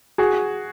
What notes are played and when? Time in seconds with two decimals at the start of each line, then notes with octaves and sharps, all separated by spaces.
0.18 F#4 G#4